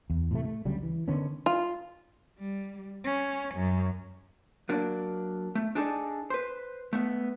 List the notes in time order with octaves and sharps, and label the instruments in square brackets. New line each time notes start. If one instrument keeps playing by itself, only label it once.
[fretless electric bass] E2
A2 C3 A3
A3
D2 C#3 F#3 G3
E3
D3 D#3 B3 C#4
[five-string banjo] F4
[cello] G3
C#4
F#2
[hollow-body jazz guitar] F#3 A#3 D4
A3
D4 D#4 G#4 A4 D5
B4 C5
A3 B3 E5